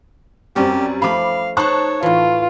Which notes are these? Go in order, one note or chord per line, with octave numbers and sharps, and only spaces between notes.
F#2 G3 C4 C#4 G4
F3 A3 F5 B5 D6
D#4 C5 C#5 A5 C#6 F#6
A2 E3 F4